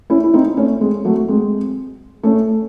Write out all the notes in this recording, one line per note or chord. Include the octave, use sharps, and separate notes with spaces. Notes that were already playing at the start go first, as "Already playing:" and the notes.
C#4 E4
E4
C4 D#4
A3 C#4
G#3 C4
F#3 A3
G#3 C4
A3 C#4